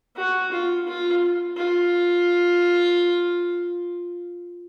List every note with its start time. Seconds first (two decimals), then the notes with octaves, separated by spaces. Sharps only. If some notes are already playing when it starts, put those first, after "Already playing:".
0.16 F#4
0.52 F4
0.88 F4
1.57 F4